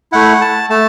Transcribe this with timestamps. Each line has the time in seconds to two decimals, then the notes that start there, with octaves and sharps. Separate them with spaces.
0.12 A3 E4 F#5
0.41 A5
0.70 A3 A5